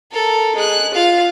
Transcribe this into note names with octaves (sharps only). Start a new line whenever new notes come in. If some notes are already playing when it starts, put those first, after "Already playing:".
A4 A#4
G#3 F#6
F4 F5